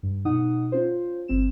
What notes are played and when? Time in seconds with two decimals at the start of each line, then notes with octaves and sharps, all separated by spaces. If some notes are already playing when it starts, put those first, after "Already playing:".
0.03 G2
0.25 B2 D#4 F#5 D#6
0.72 C#4 F4 C5
1.28 G1 C4 E7